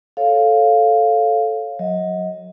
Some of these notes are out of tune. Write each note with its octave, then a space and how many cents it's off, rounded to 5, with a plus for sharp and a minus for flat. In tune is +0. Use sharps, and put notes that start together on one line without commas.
A4 -5 C#5 -10 F5 +0
F#3 -25 D#5 +25